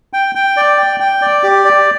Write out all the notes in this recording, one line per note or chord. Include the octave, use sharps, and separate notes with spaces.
G5
G5
D5
G5
G5
D5
G4
D5